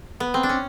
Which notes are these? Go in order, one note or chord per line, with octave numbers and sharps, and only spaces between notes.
B3
C4
D4
C#4